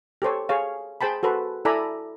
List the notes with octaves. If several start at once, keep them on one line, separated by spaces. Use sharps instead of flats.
G4 A4 C5 C#5
G#4 C#5 F5
G#4 C5 G5 A5 B5
F#4 A4 B4 C5
E4 A4 D5 G#5 A#5 B5